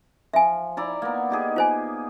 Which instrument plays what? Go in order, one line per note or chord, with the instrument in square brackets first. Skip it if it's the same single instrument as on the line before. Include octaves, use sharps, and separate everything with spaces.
[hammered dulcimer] F3 [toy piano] E5 G#5
[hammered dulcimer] E4 D5 A#5
A#3 B3
D#4 G4 G#4
[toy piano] F4 C5 G#5